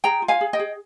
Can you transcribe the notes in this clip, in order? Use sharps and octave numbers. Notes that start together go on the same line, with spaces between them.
G#4 G5 A#5
F4
F5 G#5
G#4
D#5 G5
G#4